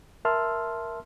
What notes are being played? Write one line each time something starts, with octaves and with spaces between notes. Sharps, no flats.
A#4 E5 A5 C6 E6 F6